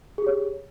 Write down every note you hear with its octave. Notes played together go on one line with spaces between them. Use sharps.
G4 G#4 C#5